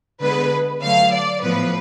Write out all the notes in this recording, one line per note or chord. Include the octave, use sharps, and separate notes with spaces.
D3 G#3 B3 B4
D3 F#3 A3 F5
D5
A2 F3 B3 B4